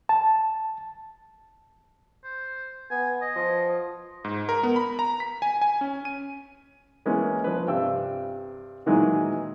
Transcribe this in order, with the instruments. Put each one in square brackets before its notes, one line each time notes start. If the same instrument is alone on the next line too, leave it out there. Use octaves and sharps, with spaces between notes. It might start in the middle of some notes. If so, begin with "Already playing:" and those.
[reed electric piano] A5
[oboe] C5
[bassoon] B3 [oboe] G#5
[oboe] D#5
[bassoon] F3
[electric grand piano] G#2
A#4
B3
B5
A#5
B6
G#5
G#5
C#4
D#7
[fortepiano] E3 G#3 A#3 B3 C#4
F3 B4
G2 C3 G5 E6
A#2 D#3 E3 F#3 G#3 B3